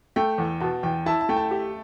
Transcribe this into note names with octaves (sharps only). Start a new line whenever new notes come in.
A3 G5
E2
B2 A5
E2 G5
E4 A5
A5
A3 G5
A5
G4